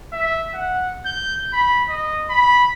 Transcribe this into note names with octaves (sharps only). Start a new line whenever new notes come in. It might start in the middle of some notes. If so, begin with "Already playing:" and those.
E5
F#5
G6
B5
D#5
B5